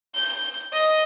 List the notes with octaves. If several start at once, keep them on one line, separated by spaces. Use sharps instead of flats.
G6
D#5